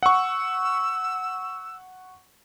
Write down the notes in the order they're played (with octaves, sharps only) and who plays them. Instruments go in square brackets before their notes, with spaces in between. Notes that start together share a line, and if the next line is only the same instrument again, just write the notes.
[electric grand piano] F#5 C#6 [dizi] E6